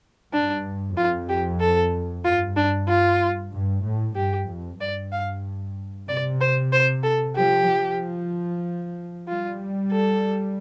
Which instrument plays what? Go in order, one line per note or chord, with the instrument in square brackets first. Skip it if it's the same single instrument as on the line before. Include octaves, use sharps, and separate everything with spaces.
[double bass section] G2 [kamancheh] D4
[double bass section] F2 [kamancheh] F4
[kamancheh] G4
A4
[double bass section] G2 [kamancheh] F4
[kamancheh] D4
F4
[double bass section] G2
A2
[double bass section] G2 [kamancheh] G4
[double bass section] F2
[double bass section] G2 [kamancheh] D5
[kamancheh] F5
[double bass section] C3 [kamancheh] D5
[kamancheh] C5
C5
A4
[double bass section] F3 [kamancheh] G4
[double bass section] F3
[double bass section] G3 [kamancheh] F4
[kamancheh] A4